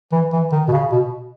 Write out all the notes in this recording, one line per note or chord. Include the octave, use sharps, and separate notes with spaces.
E3
E3
D#3
B2
C#3
B2